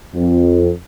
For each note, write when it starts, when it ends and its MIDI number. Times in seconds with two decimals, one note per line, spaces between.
0.14 0.71 41